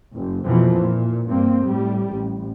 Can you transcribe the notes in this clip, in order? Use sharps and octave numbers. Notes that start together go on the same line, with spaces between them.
F#1
F2 B2 E3 F3 A#3
A#2
G2 A#3 C4
A2 G3
A1